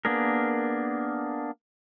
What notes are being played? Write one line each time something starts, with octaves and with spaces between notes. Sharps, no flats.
A#3 B3 D4 G#4 A#4